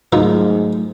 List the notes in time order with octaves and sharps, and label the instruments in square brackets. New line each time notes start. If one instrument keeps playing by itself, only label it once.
[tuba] G#2 [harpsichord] D#3 F3 [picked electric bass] F#3 A3